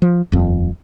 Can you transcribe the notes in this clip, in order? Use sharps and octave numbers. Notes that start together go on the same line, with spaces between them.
F3
D#1 F2